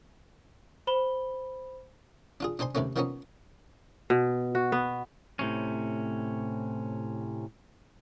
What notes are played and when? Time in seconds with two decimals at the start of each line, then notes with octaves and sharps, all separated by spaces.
0.87 C5 B5 G7
2.40 D4 F4 G#4
2.59 D4 D#4 C5 G#5 C6
2.75 D#2 C3 A3 A#3 C#4
2.96 D#3 F3 A#3 B3 C#4 D#4
4.10 B2
4.55 F#4
4.72 B3
5.39 A2 C3 C#4